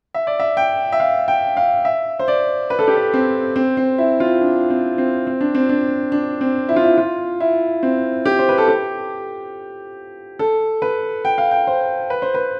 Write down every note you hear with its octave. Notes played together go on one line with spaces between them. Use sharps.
E5
D5
E5
G5
E5
F5
G5
F5
E5
C5
D5
B4
A4
G4
A4
C4
C4
C4
E4
F4
D4
C4
C4
C4
D4
C4
D4
D4
C4
E4
F4
E4
F4
E4
C4
G4
C5
B4
A4
G4
A4
B4
G5
F5
G5
C5
B4
C5
B4